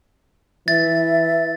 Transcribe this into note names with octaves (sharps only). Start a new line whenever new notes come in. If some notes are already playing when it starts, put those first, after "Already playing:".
E3 E5 A6